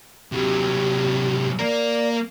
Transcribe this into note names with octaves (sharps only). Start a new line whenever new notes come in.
C3 F#3 G4
A#3 A#4 D5